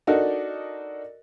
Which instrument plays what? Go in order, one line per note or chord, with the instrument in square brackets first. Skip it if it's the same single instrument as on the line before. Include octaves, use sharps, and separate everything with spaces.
[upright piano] D4 D#4 F#4 A4 A#4 D#5